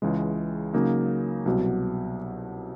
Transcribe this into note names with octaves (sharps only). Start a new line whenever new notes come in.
C#2 C#3 E3 G#3
C#3 F#3 A#3 D#4
C2 B2 F#3